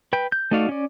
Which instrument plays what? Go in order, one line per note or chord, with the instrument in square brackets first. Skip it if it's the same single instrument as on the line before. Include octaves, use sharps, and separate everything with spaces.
[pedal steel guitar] B4 G5
G6
A3 D#4 F#4 D5 F5
C#4 D5